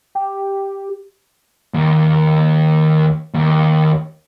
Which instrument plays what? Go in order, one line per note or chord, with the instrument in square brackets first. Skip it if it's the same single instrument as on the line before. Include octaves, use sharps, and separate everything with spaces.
[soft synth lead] G4
[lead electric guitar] D#2
D#2